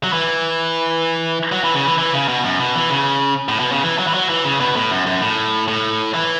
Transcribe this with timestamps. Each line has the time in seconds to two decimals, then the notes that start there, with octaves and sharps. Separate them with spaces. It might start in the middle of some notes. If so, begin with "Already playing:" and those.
0.03 F#3
0.13 E3
1.52 F#3
1.64 E3
1.75 C#3
1.87 E3
1.98 E3
2.14 C#3
2.28 B2
2.44 F#2
2.60 B2
2.75 E3
2.90 C#3
3.49 A2
3.59 B2
3.72 C#3
3.83 E3
3.98 F#3
4.07 E3
4.14 F#3
4.29 E3
4.44 C#3
4.60 B2
4.76 A2
4.91 F#2
5.06 F#2
5.22 A2
5.68 A2
6.14 E3